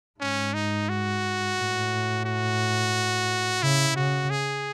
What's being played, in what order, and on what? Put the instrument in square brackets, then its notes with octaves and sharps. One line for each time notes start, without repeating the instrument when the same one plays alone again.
[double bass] G#2 [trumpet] C#4
[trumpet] D#4
F#4
[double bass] A2
[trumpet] F#4
[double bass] C#3 [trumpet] E4
[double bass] C#3 [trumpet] F#4
[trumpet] G#4